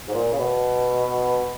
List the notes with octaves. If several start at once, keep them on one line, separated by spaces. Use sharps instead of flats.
G#2
A#2
C#3
B2